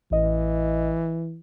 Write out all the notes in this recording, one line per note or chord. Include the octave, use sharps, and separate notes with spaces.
A1 E3 D#5